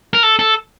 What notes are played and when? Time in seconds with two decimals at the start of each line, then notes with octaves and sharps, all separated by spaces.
0.13 A#4
0.23 A4
0.39 A4